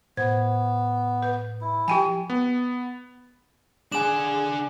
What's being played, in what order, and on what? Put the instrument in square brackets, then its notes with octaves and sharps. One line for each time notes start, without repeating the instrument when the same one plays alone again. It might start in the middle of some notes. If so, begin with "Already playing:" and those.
[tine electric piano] A2 [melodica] B3 [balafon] C5
[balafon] B4
[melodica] E4
[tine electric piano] F3 [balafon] G4 G5 G#5
[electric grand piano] B3
[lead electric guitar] D4 F#5 [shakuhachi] G#4 [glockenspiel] G#5 E7